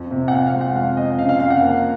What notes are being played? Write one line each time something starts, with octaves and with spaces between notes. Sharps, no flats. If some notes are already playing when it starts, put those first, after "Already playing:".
Already playing: F2
C3
F#5
C3 F5
F5
G#3
F#5
F2 F5
F2 D#5
C#3 F5
F5
F2 F5
F#5
A#3